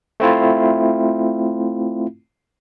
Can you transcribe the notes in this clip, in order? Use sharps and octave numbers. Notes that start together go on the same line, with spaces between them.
A3 C4 E4 F4